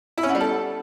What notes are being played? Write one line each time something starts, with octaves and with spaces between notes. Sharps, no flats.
E4
C#4
B3
G3
A4